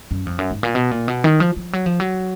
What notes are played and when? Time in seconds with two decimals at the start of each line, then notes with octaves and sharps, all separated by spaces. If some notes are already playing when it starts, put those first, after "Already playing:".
0.11 F#2
0.26 F2
0.39 F#2
0.51 G#2
0.63 A#2
0.75 B2
0.91 A#2
1.08 B2
1.24 D#3
1.40 F3
1.57 F3
1.73 F#3
1.86 F3
2.00 F#3